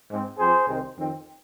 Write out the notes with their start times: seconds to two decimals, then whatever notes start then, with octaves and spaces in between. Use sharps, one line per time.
0.09 G#2 G#3 C4
0.38 F2 F3 C4 G#4 C5
0.67 C2 C3 D#3 C4
0.97 F2 D#3 C4